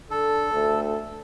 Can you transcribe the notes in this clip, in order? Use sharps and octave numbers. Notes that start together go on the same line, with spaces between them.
D3 A4
D2